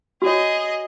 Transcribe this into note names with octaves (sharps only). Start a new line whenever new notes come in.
F#4 G#4 C#5 D#5